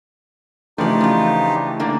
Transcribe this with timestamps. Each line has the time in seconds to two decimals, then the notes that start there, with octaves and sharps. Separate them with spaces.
0.78 C#3 E3 F3 A3 D4 D#4 G4 D5
1.01 F3 F4
1.80 D3 A#3 D4